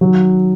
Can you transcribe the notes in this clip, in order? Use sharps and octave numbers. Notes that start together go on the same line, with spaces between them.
D#3 F#3